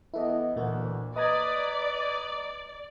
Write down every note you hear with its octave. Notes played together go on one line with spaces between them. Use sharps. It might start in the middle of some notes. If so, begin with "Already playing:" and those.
E3 B3 E4 A4 D#5
D2 A#2 E3 A#3 F#4
B4 D5 D#5 A#5 D#6 G#6